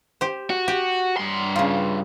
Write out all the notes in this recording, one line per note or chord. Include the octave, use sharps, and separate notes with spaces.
G4 C5
F#4
G4
G2 C6
C#3 F4